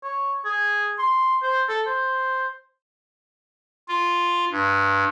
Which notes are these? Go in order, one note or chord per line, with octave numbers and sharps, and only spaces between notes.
C#5
G#4
C6
C5
A4
C5
F4
G2